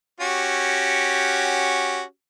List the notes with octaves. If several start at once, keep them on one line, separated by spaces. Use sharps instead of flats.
C#4 F#4 G4